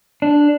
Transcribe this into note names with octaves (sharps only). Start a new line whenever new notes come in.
D4